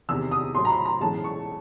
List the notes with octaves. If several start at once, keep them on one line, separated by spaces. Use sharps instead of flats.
E2 C3 D#3 E6
D#6
A2 F#3 A3 C6
A#5
B5
A#5
B1 A2 E3 G#3 C#4 A5
C#6